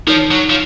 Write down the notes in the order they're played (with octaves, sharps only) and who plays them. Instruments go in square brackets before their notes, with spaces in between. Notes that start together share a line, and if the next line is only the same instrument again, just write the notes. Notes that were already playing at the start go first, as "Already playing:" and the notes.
[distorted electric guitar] F3 [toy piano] D#4 A#4 C#5
[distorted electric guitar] F#3
F3